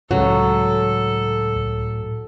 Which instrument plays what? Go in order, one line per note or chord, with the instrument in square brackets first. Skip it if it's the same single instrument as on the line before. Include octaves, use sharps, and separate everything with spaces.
[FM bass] C#2 [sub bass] A2 [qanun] F#3 [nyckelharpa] A4